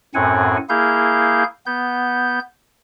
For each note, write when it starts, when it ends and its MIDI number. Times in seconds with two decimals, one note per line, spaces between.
0.14 0.57 42
0.14 0.57 45
0.14 0.57 60
0.14 0.57 78
0.14 0.57 80
0.69 1.44 58
0.69 1.44 64
0.69 1.44 68
0.69 1.44 77
0.69 1.44 91
1.66 2.39 59
1.66 2.39 91